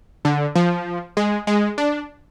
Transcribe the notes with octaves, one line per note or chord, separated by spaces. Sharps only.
D3
F3
G#3
G#3
D4